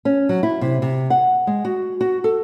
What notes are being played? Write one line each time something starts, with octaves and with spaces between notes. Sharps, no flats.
C#4
F#3
E4
C3
C3
F#5
G#3
F#4
F#4
A4